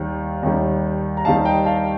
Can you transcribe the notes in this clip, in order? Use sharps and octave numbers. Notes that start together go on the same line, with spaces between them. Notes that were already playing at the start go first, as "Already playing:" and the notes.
Already playing: D#2 D#3 G3
D#2 D#3 G3
A#5
D#2 D#3 G3 F5 A5
D#5 G5
F5 A5